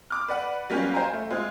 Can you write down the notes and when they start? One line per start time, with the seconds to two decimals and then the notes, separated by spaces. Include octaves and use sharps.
0.10 D6 F6
0.28 B4 D5 F#5
0.70 F#3 G3 A#3 C#4 F4 G4
0.94 C5 F5 G5 G#5 A#5
1.13 A3
1.30 G#3 C4 F4